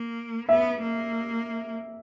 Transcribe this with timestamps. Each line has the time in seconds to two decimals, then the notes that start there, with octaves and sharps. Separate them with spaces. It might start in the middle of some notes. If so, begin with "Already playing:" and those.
Already playing: A#3
0.49 B3 E5
0.82 A#3